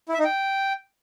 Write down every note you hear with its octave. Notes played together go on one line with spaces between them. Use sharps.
E4
E5
D#4
G5